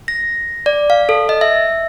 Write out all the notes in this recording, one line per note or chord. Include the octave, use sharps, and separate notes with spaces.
A#6
D5
F5
A4
D#5
E5